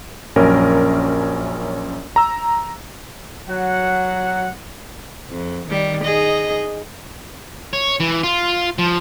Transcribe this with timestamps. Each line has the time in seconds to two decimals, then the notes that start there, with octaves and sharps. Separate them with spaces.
0.36 A#1 F#2 C#4 A#4
2.16 A#5 E6
3.49 F#3 F#5
5.30 F2
5.70 D#3 G3
6.03 D#4 G#4 D#5
7.73 C#5
8.00 E3
8.23 F4
8.78 F3